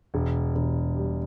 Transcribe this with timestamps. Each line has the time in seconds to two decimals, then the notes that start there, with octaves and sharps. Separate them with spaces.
0.14 E1
0.55 E1
0.96 G3